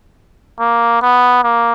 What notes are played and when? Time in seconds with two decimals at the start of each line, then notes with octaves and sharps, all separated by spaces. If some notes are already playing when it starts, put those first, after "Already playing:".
0.60 A#3
1.02 B3
1.44 A#3